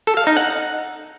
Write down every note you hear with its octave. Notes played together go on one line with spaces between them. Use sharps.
A4
F5
D#4
F#5